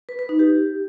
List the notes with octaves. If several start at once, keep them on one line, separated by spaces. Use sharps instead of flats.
B4
B4
D#4
G4